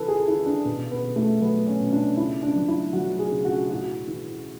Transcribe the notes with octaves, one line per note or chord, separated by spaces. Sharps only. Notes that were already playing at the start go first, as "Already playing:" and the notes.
Already playing: C#3 E3 A4 B4
G#4
E3 E4
D4
B2
B3
B2
A3
F#3 B3
C#4
B2
D4
C#3 E4
D4
F#3
E4
F#3 F#4
G#4
C#3
F#4
A2 F#4
E3